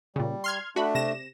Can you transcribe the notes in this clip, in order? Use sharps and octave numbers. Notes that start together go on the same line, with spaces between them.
A#2 C#3 G3
C6 F6 G#6
A3 D4 F#4 B5
C3 A#6 E7